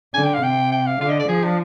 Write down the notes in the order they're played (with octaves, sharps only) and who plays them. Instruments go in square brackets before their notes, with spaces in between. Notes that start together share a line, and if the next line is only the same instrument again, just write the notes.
[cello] D3 [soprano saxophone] G#5
[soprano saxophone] G5
F5
[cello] C3 [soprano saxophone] G5
[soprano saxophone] G5
F5
[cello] D3 [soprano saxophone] F5
[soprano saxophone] D#5
D5
[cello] F3 [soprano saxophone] G#4
[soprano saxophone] D4